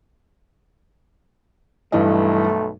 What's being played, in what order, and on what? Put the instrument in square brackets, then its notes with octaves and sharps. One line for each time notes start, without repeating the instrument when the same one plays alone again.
[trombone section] B1 A3 [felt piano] G2 E3 D#5